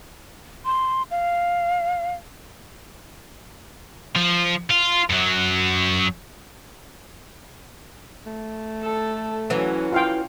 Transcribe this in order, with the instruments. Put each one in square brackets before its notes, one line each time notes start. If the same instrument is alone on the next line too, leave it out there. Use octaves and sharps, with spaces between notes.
[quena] C6
F5
[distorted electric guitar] F3
F4
F#2 F#3
[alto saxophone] A3
[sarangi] A4
[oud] E3 F#3 [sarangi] C#4
[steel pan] F4 F5 G5